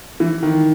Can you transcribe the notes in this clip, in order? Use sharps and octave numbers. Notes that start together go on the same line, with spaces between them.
E3
D#3